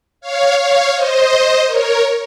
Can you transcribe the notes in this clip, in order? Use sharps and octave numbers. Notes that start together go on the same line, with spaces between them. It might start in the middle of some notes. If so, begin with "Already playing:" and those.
C#5 F5
C#5 F5
C5 D#5
A#4 C#5